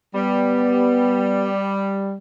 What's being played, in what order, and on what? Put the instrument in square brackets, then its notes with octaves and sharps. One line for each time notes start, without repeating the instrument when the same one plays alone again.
[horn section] G3 [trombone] B3